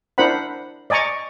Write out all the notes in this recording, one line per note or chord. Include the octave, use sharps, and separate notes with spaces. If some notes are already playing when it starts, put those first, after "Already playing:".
D4 E4 A#4 C5 F#5 B5
D5 D#5 G#5 A#5 C#6